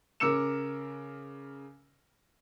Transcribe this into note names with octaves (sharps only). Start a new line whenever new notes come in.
C#3 A#4 D6 E6 C#7 E7